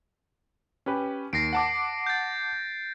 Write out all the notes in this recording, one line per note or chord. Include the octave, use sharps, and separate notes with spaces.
C#4 G4 B4
D#2 A#6 C7 D7
F#5 A5 D6
G6 A6